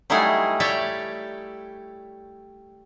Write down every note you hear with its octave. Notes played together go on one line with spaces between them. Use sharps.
F#3 G3 A3 D#4 E4 G#4
G4 C#5 D5 E5